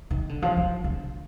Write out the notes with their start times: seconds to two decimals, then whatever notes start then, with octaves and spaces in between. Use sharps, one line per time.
0.11 D#3
0.29 D3
0.42 F3
0.57 F3
0.84 D3